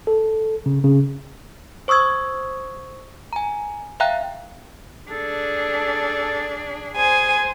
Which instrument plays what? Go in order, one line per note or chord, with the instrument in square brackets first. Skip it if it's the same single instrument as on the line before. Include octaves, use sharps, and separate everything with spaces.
[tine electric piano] A4
C#3
C#3
[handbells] C5 C#6 D#6 E6 G#6
G#5 A#5
E5 F5 G5 A#5 F#6
[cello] D4 G#4 [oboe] A4
[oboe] G#4 [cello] C5 [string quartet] G#5